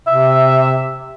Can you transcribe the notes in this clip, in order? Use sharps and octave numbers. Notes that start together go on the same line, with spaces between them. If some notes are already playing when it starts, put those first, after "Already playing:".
C3 E5